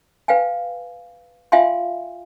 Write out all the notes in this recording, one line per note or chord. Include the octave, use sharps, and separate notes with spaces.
B4 F5 G5 G#5
F4 E5 F5 G5 G#5 C6